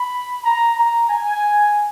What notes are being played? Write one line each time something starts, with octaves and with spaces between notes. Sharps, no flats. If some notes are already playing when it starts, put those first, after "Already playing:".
Already playing: B5
A#5
A#5
G#5